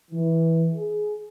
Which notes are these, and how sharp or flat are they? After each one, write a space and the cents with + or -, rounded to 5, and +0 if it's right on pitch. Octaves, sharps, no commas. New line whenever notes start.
E3 -10
G#4 +15